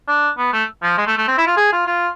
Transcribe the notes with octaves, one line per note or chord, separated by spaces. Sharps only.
D4
B3
A3
F3
G#3
A3
A3
C4
E4
F4
G#4
F4
F4